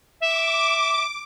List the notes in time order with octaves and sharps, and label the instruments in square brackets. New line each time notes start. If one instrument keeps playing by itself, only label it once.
[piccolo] E5 [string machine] D6